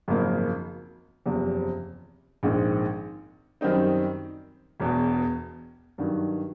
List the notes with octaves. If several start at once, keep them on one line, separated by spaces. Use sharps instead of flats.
G#1 F#2 C#3 F3 A#3
F#1 E2 C3 F3
A#1 G#2 D#3 G#3 C4
F#2 D#3 G3 C4 D#4
E1 E2 B2
G2 D#3 F#3